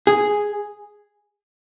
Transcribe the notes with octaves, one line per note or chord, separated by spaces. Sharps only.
G#4